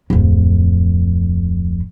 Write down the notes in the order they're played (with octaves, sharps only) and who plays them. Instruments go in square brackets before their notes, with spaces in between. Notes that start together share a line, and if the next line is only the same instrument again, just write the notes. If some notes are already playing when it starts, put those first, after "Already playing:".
[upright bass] D1 F2